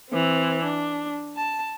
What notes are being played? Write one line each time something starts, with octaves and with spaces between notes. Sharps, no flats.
E3 C4
D4
A5